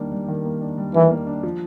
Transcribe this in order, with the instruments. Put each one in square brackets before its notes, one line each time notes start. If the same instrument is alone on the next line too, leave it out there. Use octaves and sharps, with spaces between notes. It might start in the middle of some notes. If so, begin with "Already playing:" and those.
Already playing: [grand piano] D#3 G3 A#3 D4
G3
D#3
A#3
D4
G3
[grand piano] D#3 [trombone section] E3
[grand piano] A#3
D4
F3